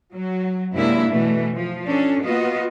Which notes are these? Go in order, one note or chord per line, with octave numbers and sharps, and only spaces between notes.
F#3
F#2 C3 G#3 A#3 D4 E4
B2 E3 A3
F3
C#4 D4 A4
A#3 B3 F4 F#4 D#5